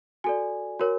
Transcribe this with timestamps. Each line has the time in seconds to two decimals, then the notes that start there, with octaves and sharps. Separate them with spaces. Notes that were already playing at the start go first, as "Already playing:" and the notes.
0.24 F#4 A4 D5 G#5
0.79 F#4 A#4 C#5